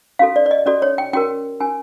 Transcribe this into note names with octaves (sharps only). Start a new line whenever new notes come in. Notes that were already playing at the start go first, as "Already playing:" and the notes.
C#4 F#4 A4 F5
D5
D5
D#5
C#4 F#4 A4 D5
C#5
G5
C#4 F#4 A#4 G5
C#4 F#4 A#4 G#5